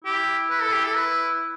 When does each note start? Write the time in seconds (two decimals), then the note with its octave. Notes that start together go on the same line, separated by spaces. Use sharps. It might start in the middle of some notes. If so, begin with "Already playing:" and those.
0.04 E4 G4
0.50 B4
0.61 A4
0.73 G4
0.84 A4
0.96 B4